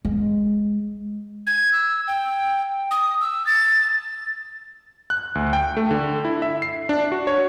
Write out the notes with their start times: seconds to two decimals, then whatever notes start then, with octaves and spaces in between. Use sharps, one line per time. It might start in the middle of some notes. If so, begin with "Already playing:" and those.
0.05 G#3
1.47 G#6
1.73 E6
2.08 G5
2.91 D#6
3.21 E6
3.47 A6
5.10 F#6
5.35 D2
5.53 G5
5.77 A3
5.91 D3
6.25 E4
6.42 E5
6.62 C7
6.89 D4
7.12 F#4
7.27 C#5